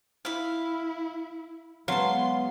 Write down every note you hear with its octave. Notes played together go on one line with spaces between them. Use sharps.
E4 F5 B5
F#3 G#3 B3 F5 A5 C6